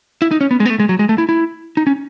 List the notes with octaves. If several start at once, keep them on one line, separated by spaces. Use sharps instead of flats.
E4
D#4
C#4
B3
G#3
B3
A3
G#3
F#3
G#3
A3
E4
E4
D#4
C#4